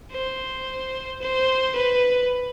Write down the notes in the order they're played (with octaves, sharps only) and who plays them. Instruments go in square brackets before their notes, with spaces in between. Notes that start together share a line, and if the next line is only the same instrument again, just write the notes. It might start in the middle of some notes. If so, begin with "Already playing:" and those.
[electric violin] C5
C5
B4